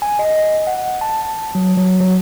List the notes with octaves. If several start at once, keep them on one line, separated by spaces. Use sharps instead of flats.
G#5
D#5
F#5
A5
F#3
F#3
F#3